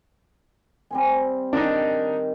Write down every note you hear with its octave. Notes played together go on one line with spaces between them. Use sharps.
G3 C4 G#5
D#3 D4 D#4